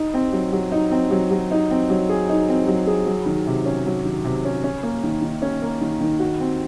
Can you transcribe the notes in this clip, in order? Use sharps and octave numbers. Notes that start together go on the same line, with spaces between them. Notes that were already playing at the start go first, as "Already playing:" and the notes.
Already playing: D#4
C4
F#3
F#3
D#4
C4
F#3
F#3
D#4
C4
F#3
G#4
D#4
C4
F#3
G#4
F#3
D#3
C3
C#4
F#3
D#3
C3
C#4
C#4
A#3
D#3
D#3
C#4
A#3
D#3
D#3
F#4
C4